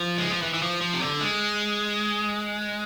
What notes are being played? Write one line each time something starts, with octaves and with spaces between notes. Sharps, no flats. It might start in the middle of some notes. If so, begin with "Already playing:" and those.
Already playing: F3
G#3
F3
E3
E3
F3
F3
C3
D3
G#3